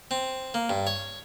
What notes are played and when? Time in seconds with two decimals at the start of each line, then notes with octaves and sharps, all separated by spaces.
0.11 C4
0.54 A#3
0.70 G2
0.87 C#5